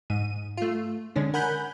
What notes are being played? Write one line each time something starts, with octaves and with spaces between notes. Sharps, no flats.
G#2 D#7
A3 F4
D3 G#3 C#4 D4
A#4 F#5 G#5 B5 F#6 G6